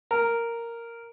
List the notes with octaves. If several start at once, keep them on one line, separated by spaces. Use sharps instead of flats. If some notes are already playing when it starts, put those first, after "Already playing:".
A#4